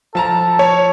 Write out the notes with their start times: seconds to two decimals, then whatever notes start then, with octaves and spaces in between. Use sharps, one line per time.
0.15 F3 A4 A5 A#5
0.59 C#5